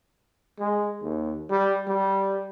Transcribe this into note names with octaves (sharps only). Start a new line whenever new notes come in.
G#3
D#2
G3
G3